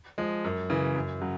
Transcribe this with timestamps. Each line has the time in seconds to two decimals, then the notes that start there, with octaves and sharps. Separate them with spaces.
0.18 F3 G#3
0.44 F#2
0.70 C#3 E3
0.96 F#2
1.22 C#3 F#3